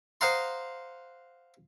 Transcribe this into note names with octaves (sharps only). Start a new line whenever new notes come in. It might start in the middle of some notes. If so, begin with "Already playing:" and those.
C5 D#5 F5 F#5 A#5 C6